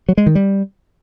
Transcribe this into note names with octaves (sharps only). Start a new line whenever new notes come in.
F#3
G#3
D#3
G3